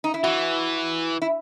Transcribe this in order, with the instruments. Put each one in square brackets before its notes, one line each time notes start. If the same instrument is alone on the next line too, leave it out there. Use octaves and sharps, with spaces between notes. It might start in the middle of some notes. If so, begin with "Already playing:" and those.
[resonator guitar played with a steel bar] D#4
E4
[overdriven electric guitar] E3 [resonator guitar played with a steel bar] F#4
[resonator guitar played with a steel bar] E4